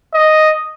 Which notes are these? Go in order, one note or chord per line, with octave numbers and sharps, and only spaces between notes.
D#5